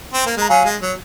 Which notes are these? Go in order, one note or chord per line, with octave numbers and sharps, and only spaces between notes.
C4
A#3
G#3 A#5
F#3 F5 G#5
G#3
F#3